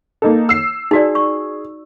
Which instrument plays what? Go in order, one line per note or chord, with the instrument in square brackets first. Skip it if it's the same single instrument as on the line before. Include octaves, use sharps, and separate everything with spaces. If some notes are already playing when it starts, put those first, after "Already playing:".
[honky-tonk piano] A#3 D#4 A4
E6 C7
[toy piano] D#4 F#4 D5 [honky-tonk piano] G#4
[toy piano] C#6